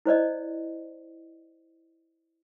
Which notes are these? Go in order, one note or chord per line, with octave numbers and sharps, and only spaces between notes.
E4 C5 D5 D#5